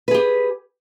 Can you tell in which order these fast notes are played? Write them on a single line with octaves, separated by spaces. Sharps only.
B4 G#4 G4